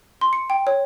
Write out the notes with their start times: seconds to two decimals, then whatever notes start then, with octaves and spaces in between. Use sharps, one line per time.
0.21 C6
0.33 C#7
0.50 G5
0.67 C#5